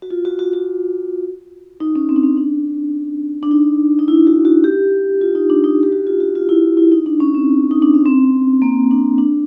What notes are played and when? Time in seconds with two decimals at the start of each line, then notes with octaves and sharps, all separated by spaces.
0.02 F#4
0.11 F4
0.25 F#4
0.39 F#4
0.53 F#4
1.80 D#4
1.96 C#4
2.09 C4
2.16 D4
2.23 C#4
2.37 D4
3.43 D4
3.51 D#4
3.99 D#4
4.08 E4
4.27 F#4
4.45 F#4
4.64 G4
5.21 F4
5.35 D#4
5.50 D4
5.64 D#4
5.83 G4
5.92 F#4
6.07 F4
6.20 F#4
6.35 F4
6.49 E4
6.77 E4
6.92 D#4
7.06 D4
7.20 C#4
7.34 C4
7.71 D#4
7.82 D4
7.94 C#4
8.06 C4
8.62 A#3
8.91 D4
9.18 D4